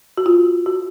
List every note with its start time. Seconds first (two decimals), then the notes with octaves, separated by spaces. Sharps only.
0.18 F#4
0.26 F4
0.66 F#4